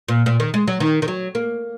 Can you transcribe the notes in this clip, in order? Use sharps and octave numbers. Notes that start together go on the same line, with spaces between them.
A#2
A#2
D#3
G#3
F#3
D#3
D#3
F#3
A#3